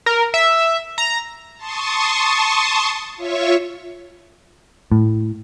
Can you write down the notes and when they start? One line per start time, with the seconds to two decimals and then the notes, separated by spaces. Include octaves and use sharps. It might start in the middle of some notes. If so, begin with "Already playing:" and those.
0.06 A#4
0.34 E5
0.98 A#5
1.56 A5 C6 C#6 D#6
3.16 F4 C#5 E5 C#6
4.92 A2